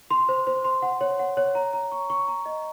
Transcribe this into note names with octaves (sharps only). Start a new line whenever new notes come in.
C6
C5
C5
C6
F#5
C#5
F#5
C#5
A#5
A#5
C#6
C#6
A#5
D#5